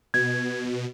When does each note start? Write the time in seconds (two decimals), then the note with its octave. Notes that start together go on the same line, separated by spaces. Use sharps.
0.14 B2 G#6